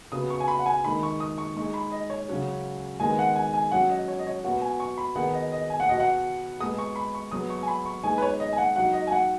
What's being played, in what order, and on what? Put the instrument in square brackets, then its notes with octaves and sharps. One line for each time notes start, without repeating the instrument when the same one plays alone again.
[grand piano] C#3 B3 F#4 [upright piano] D#6
[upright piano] C#6
G#5
B5
F#5
G#5
[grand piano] D#3 G#3 D#4 [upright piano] B5
[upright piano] C#6
D#6
C#6
[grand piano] G#3 D#4 G#4 [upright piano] C#6
[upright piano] B5
D#5
C#5
[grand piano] C#3 F#3 C#4 F#4
[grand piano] D#3 G#3 B3 G#4 [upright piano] G#5
[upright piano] F#5
G#5
G#5
[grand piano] F#3 C#4 F#4 [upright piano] F#5
[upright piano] D#5
C#5
D#5
C#5
[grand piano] B2 B3 F#4 [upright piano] F#5
[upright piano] G#5
C#6
B5
[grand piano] D#3 B3 D#4 G#4 [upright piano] F#5
[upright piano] D#5
D#5
G#5
F#5
[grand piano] B2 B3 F#4 [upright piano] D#5
[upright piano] F#5
[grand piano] G#3 B3 G#4 [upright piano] D#6
[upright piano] C#6
B5
C#6
[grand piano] F#3 B3 G#4 [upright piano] D#6
[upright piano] C#6
G#5
B5
C#6
[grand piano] G#3 B3 D#4 G#4 [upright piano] G#5
[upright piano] B4
C#5
D#5
G#5
F#5
[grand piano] F#3 D#4 F#4 [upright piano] F#5
[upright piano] D#5
G#5
F#5